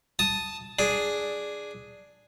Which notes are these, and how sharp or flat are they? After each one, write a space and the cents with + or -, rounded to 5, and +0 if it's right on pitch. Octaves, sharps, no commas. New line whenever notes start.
A5 +0 D#6 +0
D4 +0 G#4 +0